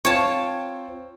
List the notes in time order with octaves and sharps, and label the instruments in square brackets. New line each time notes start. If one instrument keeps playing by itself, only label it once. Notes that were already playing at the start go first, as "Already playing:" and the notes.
[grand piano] C4 F4 G5 [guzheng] C#5 A5